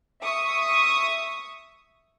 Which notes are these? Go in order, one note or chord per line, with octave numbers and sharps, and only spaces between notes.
E5 C#6 D#6